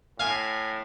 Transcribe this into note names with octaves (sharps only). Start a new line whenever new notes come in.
A2 F5 G#5